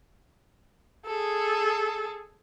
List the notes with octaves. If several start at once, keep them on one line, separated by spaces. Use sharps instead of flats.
G#4 A4